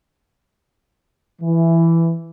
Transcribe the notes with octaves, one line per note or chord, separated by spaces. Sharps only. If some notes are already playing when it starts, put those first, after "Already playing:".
E3